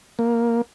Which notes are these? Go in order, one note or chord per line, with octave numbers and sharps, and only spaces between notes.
A#3